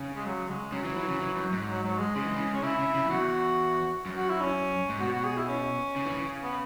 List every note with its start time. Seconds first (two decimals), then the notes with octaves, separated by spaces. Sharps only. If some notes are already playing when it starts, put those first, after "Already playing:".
Already playing: C#3
0.16 G#3
0.26 F#3
0.49 G#3
0.72 C#3 F#3
0.84 E3
0.97 E3
1.08 C#3
1.20 E3
1.36 F#2
1.52 G#2
1.68 F#3
1.84 F#3
1.99 G#3
2.16 C#3 G#3
2.25 E3
2.34 C#3
2.54 C#4
2.63 C#3 E4
2.79 C#3
2.95 C#3
3.04 F#2
3.10 E2 F#4
4.06 F#2
4.17 F#4
4.29 E4
4.41 C#4
4.89 G#2
5.00 B2 F#4
5.12 F#4
5.24 G#4
5.37 E4
5.48 C#4
5.96 C#3
6.05 E3
6.13 C#3
6.43 B3